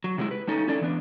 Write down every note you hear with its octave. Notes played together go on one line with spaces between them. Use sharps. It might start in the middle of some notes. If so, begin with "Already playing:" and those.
F#3
C3 F#3 G#3 E4
B4
G3 A3 C#4 D#4 A4
C#4 E4 A4 D5
E3 B3 D4